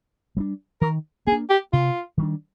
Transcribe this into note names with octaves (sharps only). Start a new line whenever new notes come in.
G3 A#3 D4
D#3 A#4
A#3 D4 G#4
G4
C3 F4
D#3 G3 D4